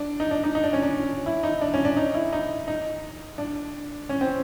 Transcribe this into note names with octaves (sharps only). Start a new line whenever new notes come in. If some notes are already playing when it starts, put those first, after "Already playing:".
Already playing: D4
D#4
D4
D#4
D#4
D4
C#4
D4
E4
D#4
D4
C#4
D4
D#4
E4
D#4
D#4
D4
C#4
C4